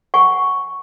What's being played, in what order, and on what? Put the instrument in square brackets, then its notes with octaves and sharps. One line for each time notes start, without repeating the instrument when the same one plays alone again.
[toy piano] F#5 G#5 C#6